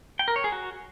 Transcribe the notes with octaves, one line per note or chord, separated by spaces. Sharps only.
G5
A#4
C#5
G#4
F#4